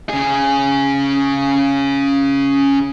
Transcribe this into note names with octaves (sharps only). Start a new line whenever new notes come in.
C#3 G#4